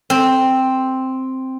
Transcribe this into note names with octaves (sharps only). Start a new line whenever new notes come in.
C4